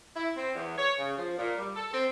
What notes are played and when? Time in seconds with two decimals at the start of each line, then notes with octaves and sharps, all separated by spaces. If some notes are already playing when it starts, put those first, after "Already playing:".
0.16 E4
0.37 C4
0.55 E2
0.78 C#5
0.99 C#3
1.17 F3
1.38 A#2
1.58 G3
1.75 A4
1.93 C4